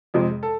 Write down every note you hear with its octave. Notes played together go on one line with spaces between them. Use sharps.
F2 C3 G#3
A4